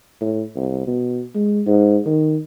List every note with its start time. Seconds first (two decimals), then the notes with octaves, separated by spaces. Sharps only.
0.21 A2
0.56 C2
0.87 B2
1.35 G#3
1.67 G#2
2.06 D#3